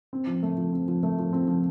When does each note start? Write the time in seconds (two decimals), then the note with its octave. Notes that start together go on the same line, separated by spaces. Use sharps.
0.13 C4
0.27 F3
0.43 A3
0.58 F3
0.73 C4
0.88 F3
1.03 A3
1.19 F3
1.33 C4
1.48 F3